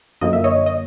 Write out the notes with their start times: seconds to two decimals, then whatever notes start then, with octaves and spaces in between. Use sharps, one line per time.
0.21 F#2 D3 F3 A#3 D#5
0.33 E5
0.44 C#5 D#5
0.66 D#5